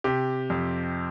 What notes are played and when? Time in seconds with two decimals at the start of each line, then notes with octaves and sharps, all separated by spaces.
0.04 C3 G4
0.50 F2